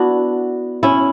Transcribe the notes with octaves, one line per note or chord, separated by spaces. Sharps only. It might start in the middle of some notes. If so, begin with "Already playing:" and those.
Already playing: B3 D4 E4 F#4
C#4 E4